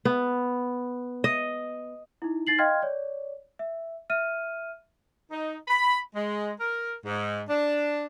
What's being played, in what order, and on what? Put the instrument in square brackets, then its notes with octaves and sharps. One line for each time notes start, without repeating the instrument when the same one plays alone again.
[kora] B3
D#5
[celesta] D#4 E4
D#4 A6 C7 F#7
D#5 F5 G5 C6 F6 G#6
C#5 D5
E5
E5 F6 D#7
[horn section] D#4
B5
G#3
A#4
G#2
D4